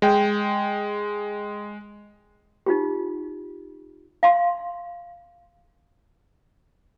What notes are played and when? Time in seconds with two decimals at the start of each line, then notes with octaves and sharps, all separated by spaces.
0.02 G#3 G5
2.66 D#4 F4 G4
4.23 F5 C6